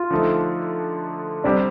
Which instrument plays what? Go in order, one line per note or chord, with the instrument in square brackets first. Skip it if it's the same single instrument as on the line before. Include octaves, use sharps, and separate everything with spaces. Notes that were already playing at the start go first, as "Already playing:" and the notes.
Already playing: [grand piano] F4
[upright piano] D3 F3 A3 D#4 A4
[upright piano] C3 G3 C4 G4 [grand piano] D4